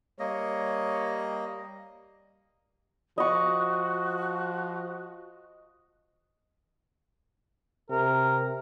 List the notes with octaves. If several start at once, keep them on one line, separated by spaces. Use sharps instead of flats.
G3 A#3 C#5 D#5
F3 F#4 D#5 C#6
C3 A#4